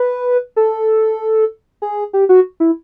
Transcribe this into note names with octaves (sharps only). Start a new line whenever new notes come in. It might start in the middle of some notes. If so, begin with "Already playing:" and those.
Already playing: B4
A4
G#4
G4
F#4
E4